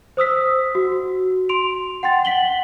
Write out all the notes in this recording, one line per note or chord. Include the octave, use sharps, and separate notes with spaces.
C5 D#6 E6 B6
F#4
C6 D7 F7
F#5 G5 C6 A6
F#5 B6 F#7 G7